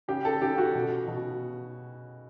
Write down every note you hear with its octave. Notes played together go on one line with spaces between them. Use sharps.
C#3 G4
A4
C#3 G4
F#4
B2
B2